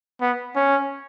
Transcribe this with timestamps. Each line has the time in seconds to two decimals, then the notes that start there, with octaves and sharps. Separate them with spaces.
0.21 B3
0.56 C#4